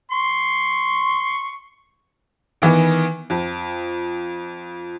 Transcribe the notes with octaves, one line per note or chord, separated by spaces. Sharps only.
C6 C#6
D#3 E3 B3
F2